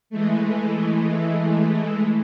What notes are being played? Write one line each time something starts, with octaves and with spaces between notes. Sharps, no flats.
E3 G#3 A3